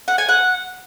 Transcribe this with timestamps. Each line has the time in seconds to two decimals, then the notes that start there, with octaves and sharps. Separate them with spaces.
0.08 F#5
0.18 G#5
0.28 F#5